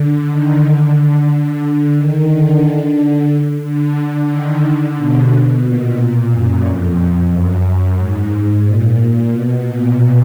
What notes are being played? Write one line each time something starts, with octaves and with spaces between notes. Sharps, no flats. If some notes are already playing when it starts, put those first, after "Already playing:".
Already playing: D3
D#3
D3
D3
D#3
D3
D3
D#3
D3
B2
A#2
F#2
F2
F#2
G#2
A#2
B2
A#2